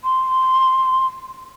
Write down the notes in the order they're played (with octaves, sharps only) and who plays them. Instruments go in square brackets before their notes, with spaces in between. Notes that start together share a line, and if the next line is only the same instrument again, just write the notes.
[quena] C6